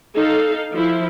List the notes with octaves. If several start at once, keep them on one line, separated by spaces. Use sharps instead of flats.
D#4 A4 F5
F3 E4